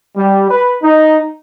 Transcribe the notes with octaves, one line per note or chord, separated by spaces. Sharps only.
G3
B4
D#4